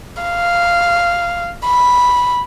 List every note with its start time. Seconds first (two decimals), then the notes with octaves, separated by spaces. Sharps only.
0.23 F5
1.66 B5